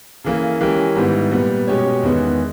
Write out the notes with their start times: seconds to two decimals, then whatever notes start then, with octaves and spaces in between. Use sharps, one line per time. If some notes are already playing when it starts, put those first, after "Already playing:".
0.24 C#3 E3 A#3
0.60 E3 G#3 C#4 G4 A#4
0.96 G#2 D#3 G3 B3 E4
1.31 A#2 G3 B3
1.67 B2 G#3 C#4 G4 C#5
2.03 E2 D#3 G#3 B3